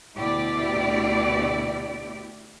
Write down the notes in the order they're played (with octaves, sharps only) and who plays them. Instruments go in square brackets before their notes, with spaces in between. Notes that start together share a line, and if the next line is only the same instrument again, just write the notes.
[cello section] D2 B2 E4 G4 D5